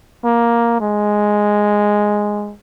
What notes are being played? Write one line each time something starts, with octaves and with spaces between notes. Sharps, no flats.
A#3
G#3